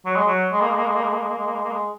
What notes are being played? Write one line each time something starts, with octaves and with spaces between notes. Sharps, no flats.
F#3
G#3
F#3
G#3
A#3
G#3
A#3
G#3
A#3
G#3
A#3
G#3
A#3
G#3
A#3
G#3
A#3
G#3